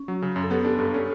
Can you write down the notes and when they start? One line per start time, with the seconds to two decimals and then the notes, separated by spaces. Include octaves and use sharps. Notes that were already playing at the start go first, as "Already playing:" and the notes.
Already playing: C#4
0.08 F#3
0.22 C#3
0.36 F#2
0.43 A4
0.50 B3 G4
0.65 D4
0.79 G2
0.94 C#4